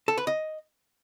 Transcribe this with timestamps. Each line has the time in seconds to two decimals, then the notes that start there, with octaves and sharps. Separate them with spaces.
0.08 A4
0.18 B4
0.27 D#5